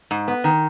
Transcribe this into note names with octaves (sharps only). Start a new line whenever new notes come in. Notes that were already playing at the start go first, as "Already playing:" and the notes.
G#2
B3
D#3